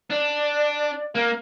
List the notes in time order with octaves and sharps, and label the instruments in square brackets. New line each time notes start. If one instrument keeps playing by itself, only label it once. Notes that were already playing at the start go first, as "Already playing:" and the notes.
[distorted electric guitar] D4 [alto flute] D5
[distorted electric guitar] A#3 [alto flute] A#4